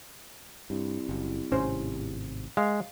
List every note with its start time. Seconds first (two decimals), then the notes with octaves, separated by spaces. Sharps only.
0.70 C2 G2
1.09 F#1
1.52 G#1 A2 C3 C#4 C5
2.57 G#3 F5